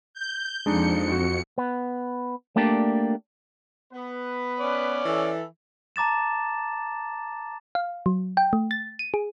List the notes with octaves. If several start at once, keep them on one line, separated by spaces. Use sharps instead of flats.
G6
F2 G#3 D4 D#4 C#7
F#4
B3
A3 A#3 D4 G4 D5
B3 B4
C#4 D5
E3 A4
A5 A#5 D6 A6 E7
F5
F#3
G5
A3
A6
D#7
G#4